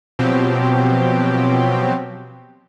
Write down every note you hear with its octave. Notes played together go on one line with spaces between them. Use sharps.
B2 F3 F#3 C4 G4